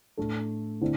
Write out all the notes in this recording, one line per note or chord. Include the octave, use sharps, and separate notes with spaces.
A2 A3 D4 A4
D3 C4 E4